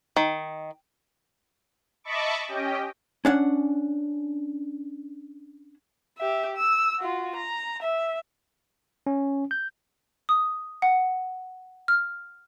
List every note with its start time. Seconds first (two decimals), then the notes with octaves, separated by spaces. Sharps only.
0.16 D#3
2.04 D#5 E5 A5 B5 C#6 D6
2.49 C#4 G4 D#5 G5
3.25 C#4 D4 F#5
6.17 G4 E5
6.57 E6
6.99 F4 F#4
7.36 A#5
7.83 E5
9.07 C#4
9.51 G6
10.29 D#6
10.82 F#5
11.88 F6